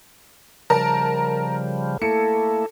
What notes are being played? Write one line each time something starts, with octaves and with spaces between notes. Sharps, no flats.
C#3 F3 G3 A#4 A5
A3 A#3 E4 A4 C#7